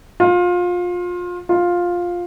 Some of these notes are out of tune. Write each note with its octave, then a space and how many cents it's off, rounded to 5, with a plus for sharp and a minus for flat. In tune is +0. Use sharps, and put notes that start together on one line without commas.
F4 +25
F4 +10